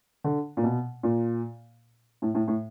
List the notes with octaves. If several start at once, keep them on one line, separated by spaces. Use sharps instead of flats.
D3
A#2
B2
A#2
A2
A2
A2